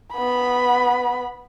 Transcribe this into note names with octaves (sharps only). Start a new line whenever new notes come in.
B3 B5